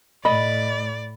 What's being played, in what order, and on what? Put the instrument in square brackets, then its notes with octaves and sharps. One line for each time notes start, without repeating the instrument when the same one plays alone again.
[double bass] A2 [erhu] D5 [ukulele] D#5 [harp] B5